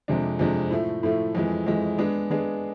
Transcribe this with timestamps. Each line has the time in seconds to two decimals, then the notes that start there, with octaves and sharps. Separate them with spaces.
0.08 F2 C3 G#3 D4
0.39 F2 C3 G#3 D4
0.71 A2 F3 A3
1.03 A2 F3 A3
1.35 F2 E3 G#3
1.66 F2 E3 G#3
1.98 G#3 B3 D4 G#4
2.31 G#3 B3 D4 G#4